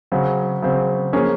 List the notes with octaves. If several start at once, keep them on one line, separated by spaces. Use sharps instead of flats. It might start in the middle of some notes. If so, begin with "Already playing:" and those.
C#3 F#3 C4
C#3 F#3 C4
F3 A#3 C#4 G#4